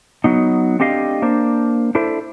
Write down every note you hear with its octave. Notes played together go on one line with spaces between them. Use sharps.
F#3 B3 D#4
A3 C4 D4 G4 D#5 F5
A#3 D4 C5
D4 E4 A4 C5 E5